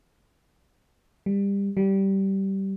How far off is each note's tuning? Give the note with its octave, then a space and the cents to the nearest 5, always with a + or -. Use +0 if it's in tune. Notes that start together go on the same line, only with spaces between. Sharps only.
G3 +25
G3 -15